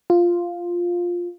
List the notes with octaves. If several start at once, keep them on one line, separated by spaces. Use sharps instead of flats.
F4